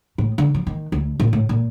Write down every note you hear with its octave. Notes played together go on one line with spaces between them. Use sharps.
A2
D3
F3
D#3
D2
A#2
A2
A#2